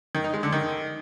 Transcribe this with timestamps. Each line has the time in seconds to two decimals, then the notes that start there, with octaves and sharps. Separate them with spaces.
0.15 D#3
0.24 D#4
0.34 G#3
0.43 D3
0.52 D#3